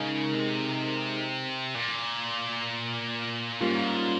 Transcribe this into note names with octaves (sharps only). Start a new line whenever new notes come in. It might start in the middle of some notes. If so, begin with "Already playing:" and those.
Already playing: C#3 G#3 D#4 A#4
C3
A#2
G#2 G3 A#3 C#4 F4